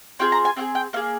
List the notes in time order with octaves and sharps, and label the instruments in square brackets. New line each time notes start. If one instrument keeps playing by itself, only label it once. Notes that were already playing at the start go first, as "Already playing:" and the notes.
[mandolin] C4 F4 G#4 G5
A#5
G#5
C4 F4 G#4 G5
G5
A#3 D#4 G#4 F5